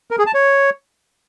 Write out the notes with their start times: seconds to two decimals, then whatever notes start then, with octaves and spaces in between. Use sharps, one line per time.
0.11 A#4
0.19 G#4
0.26 A5
0.34 C#5